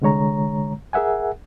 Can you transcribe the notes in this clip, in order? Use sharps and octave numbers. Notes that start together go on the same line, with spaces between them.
C2 D3 G#3 C#5 A#5
G#4 A#4 E5 F#5 G#5